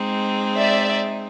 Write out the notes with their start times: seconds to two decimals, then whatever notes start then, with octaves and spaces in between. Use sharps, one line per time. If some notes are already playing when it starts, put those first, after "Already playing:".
Already playing: G#3 C4 D#4 G#4
0.57 D5 E5